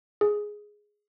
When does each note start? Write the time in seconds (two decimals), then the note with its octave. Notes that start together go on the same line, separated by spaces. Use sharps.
0.21 G#4